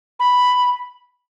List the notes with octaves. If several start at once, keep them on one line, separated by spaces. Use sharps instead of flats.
B5